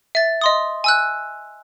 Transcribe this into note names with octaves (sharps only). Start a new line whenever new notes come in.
E5 A6
D#5 C6 D#6
G#5 E6 F#6